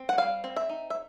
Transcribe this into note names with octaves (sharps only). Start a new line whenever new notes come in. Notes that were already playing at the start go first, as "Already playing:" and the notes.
Already playing: C4
F#5
G3 F5
C4
E5
D#4
E5